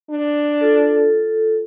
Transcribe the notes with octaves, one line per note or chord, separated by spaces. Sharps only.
D4
F4 A4